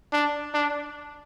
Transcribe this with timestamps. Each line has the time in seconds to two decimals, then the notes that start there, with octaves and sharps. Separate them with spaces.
0.12 D4
0.54 D4